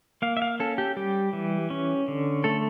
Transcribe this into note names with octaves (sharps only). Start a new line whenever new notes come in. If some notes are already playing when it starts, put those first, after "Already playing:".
A#3 F5
E5
F5
C#4 A4
G4
G3 G4
E3
C#4
D3
A3 A4